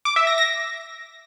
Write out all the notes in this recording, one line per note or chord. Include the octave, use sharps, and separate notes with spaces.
D6
E5
A#6
A#6